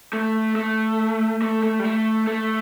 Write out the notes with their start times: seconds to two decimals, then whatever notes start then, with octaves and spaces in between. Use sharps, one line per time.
0.13 A3
0.56 A3
1.42 A3
1.63 A3
1.79 G3
1.84 A3
2.27 A3